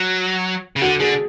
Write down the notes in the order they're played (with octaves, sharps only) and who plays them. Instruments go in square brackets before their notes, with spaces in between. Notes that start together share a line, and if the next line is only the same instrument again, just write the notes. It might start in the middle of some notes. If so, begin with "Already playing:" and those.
Already playing: [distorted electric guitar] F#3
C#3
[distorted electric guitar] D3 [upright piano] F#4
[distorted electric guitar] D3 [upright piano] G#4